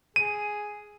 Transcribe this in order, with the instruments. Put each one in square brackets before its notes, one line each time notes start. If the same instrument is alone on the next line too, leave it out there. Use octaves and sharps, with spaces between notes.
[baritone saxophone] G#4 [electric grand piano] D#7